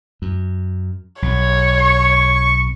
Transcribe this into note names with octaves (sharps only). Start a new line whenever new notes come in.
F#2
B1 C#5
C#6